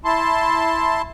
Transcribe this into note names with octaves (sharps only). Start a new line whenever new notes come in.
E4 A5 C6